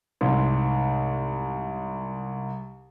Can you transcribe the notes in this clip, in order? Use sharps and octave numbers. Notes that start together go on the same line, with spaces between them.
C2 G#2